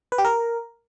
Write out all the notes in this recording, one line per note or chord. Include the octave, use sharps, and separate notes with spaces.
B4
G4
A#4